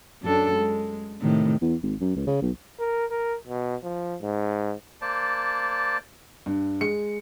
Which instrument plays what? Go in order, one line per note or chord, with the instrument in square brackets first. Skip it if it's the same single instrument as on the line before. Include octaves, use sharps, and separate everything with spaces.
[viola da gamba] F#2 D4 A4
G#3
A2 C3 D#3
[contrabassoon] E2
G#1
F#2
C#2
C#3
B1
[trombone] A#4
A#4
B2
F3
G#2
[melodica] A#3 C5 D5 A5
[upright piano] G2
G#3 C#7